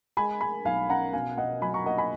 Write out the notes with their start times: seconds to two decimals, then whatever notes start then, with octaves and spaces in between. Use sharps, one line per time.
0.17 G#3 G#5 B5
0.41 G#3 G#5 B5
0.65 B1 F5 G#5
0.89 C#4 F#5 A#5
1.13 B2 F5 G#5
1.37 B2 D#5 F#5
1.62 F#3 G#5 B5
1.74 A#5 C#6
1.86 A#3 D#5 F#5
1.98 G#5 B5